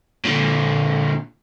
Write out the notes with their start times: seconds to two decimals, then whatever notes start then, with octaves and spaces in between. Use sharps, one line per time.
0.25 A#2 D3